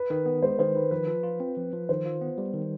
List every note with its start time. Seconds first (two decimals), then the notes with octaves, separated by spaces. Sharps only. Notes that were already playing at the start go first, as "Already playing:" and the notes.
Already playing: B4
0.10 D#3 B4
0.26 B3 B4
0.42 G#3 C5
0.59 D#3 C5
0.75 D#3 B4
0.91 F3 B4
1.07 F3
1.23 F4
1.40 C4
1.57 F3
1.73 F3
1.89 D#3 C5
2.06 F4
2.21 B3
2.38 G3
2.54 D#3